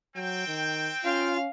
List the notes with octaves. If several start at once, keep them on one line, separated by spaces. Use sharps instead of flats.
F#3 C4 G5
D#3
C#4 F4 F5